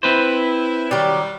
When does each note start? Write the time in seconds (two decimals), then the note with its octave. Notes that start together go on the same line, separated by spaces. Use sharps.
0.03 C4 E4 B4 C5
0.91 D#3 F#3 G3 G4 D5